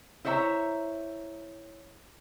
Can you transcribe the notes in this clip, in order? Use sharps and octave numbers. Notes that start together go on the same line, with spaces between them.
E4 C5 C#5 E5 A#5